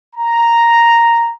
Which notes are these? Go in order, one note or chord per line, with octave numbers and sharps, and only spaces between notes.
A#5